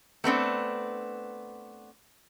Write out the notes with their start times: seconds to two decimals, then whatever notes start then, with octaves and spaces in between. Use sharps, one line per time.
0.24 A3 B3 C4 D4